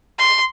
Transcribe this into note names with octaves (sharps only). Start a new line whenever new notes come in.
C6